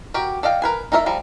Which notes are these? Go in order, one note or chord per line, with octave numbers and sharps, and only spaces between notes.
F#4 G4 A#4 G5
A4 D5 D#5 F5 G5
A#4 B4 G#5
D#4 A4 A#4 C#5 E5
F3 G3 A#5